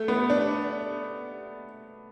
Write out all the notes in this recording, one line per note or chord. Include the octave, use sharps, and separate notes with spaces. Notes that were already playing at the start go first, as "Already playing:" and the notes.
Already playing: A3
B3
D4